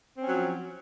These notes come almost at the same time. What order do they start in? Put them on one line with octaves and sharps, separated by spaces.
C4 C#4 F#3 F3